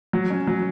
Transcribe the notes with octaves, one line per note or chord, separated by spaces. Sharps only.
F#3
C#4
F#3